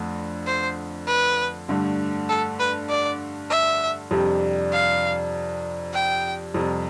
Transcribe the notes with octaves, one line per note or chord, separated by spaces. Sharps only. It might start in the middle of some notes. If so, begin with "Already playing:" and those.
Already playing: F2 D3 A3
C5
B4
G2 D3 A3
A4
B4
D5
E5
F2 C3 G3 D4 G4
F5
G5
F2 C3 G3